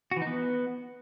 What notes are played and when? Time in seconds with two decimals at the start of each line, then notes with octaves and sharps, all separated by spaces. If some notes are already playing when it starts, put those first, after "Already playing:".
0.11 F#4
0.17 E3
0.22 D#4
0.27 B3